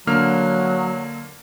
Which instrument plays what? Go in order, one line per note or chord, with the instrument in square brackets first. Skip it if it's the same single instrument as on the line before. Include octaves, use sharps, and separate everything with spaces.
[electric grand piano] D3 A#3 F6 [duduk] F#3